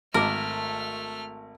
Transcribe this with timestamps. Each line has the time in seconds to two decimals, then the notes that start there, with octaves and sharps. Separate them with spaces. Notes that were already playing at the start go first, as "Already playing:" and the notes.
0.14 G#1 A3 A#4 D6 F6